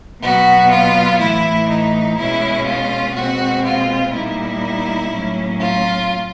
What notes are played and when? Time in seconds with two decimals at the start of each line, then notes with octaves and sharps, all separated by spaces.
0.21 B2 F#3 B3 F#4
0.70 F4
1.19 A2 E3 A3 E4
1.68 D#4
2.17 B2 G#3 C#4 E4
2.66 F4
3.15 B2 G#3 C4 F#4
3.64 F4
4.13 A#2 G3 A#3 D#4 E4
5.11 A2 F#3 A#3 C#4
5.60 F4